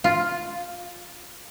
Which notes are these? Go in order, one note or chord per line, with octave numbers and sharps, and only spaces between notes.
F4